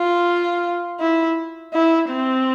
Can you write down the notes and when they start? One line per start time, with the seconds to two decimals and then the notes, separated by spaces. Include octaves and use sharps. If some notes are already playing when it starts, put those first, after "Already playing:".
Already playing: F4
1.00 E4
1.73 E4
2.10 C4